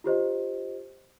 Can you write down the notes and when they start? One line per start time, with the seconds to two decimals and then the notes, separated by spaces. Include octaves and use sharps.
0.04 F4 G4 C5 D#5